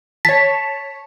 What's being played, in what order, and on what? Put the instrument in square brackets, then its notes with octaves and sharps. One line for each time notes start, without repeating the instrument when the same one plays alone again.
[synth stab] C#5 A5 [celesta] B6